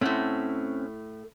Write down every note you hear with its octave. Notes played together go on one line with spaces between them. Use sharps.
A2 A3 C4 C#4 F#5